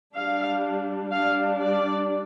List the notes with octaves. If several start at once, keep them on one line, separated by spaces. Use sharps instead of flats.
G3 D4 F5
G3 D4 F5
D5